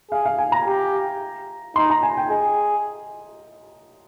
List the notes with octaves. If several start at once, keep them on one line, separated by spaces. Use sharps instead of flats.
G#4 F5
F5
G#5
A#5
G4
D#4 C6
A#5
G#5
G5
G#4 D#5